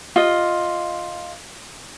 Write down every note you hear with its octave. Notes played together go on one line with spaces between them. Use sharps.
F4 D#5